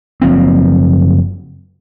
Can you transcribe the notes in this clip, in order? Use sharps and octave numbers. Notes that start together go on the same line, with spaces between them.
F#1 F3 C4